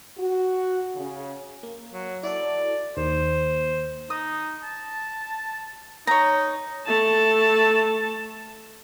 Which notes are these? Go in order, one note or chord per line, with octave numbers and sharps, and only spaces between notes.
F#4
C#3
A#3
F#3
E4 F#4 A4 D5
D#2 C5
D#4 D#6
A5
D#4 C#5 A#5
A3 A5